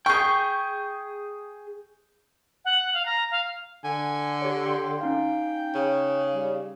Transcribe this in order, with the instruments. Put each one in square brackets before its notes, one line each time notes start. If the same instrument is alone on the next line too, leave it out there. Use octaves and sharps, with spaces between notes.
[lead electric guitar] G#4 G5 [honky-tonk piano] C#6 G6
[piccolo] F#5
F5
A#5
F5
[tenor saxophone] D3 [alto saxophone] G#5
[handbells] G4 C#5
[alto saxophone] G5 [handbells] C6
[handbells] C#4 D#4 F5
[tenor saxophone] C#3
[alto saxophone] G3